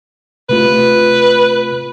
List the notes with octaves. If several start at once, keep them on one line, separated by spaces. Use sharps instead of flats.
C3 A3 F4 B4